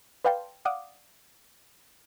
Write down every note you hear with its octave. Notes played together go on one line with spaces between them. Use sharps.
B4 D5 F5 G5 A5 C6
D5 F5 F#5 D6 D#6